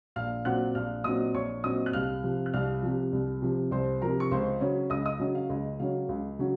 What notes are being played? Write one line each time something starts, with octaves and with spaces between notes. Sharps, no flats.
A#1 F5 F6
A#2 F#3 C4 F#5 F#6
A#1 F5 F6
A#2 F#3 C4 D#5 D#6
A#1 C#5 C#6
A#2 F#3 C4 D#5 D#6
F#6
C2 F5 F6
C3 F3
F#6
C2 F5 F6
C3 F3
C2
C3 F3
C2 C5 C6
C3 F3 A#4 A#5
C#6
C#2 C5 C6
C#3 F#3 C#4
C#2 D#5 D#6
D#5 D#6
C#3 F#3 C#4
F5
C#2 D#5
C#3 F#3 C#4 F5
C#2
C#3 F#3 C#4